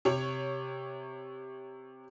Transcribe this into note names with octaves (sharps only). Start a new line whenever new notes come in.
C3 C#5